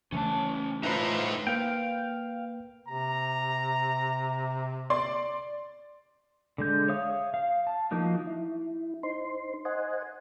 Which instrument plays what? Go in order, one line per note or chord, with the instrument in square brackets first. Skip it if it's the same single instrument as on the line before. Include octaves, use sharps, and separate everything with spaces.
[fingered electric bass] C#3 E3 A3 [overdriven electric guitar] C#4 A5
[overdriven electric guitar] A2 E5 [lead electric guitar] D#4 C5 [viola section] F4 B4 A#5
[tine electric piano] A#3 B4 [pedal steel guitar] F5 G5
[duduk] C3 [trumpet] A#5
[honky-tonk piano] D5 C6
[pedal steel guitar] D3 G#3 G6
C#5 E5 F5 D#6
F5
A5
F3 A#3 D#4 F#4
[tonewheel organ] E4
D#4 C5 C6
C5 D#5 F#5 G#5